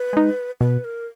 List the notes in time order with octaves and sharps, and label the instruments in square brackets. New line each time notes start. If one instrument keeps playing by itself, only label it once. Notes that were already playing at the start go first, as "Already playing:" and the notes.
Already playing: [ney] B4
[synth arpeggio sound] G#3 D#4
[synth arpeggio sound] B2 [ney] B4
[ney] A#4